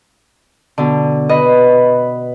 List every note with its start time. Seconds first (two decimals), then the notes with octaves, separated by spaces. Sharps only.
0.78 B2 D3
1.29 B4 D#5